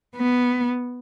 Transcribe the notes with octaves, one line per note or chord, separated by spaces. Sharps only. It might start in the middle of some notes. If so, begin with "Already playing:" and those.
B3